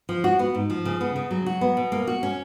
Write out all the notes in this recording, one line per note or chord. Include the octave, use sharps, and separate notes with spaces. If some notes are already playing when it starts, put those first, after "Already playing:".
F3
F#4
B3
G#2
F3
C#3
B3
C#3
F#3
F#4
B3
B2
A#3
F#4
C#4